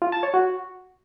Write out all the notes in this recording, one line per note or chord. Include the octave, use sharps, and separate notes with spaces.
F4
A5
C#5
F#4